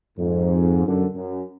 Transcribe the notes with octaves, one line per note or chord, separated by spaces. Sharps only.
F2 G#2
F#2 D3
F#2